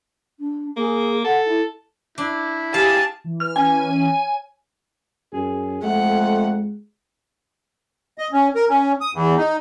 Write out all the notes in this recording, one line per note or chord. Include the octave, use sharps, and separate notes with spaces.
D4
A#3 G#4
A4 F#5
E4
D4 E4
G4 G#4 F5 A5
E3
B4 F6
E3 C#4 G#5
C#5
F#2 G#4
F2 G#3 A3 F#5
D#5
C#4
A#4
C#4
D#6
E2
D#4